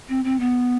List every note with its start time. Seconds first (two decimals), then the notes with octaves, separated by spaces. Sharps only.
0.09 C4
0.25 C4
0.40 B3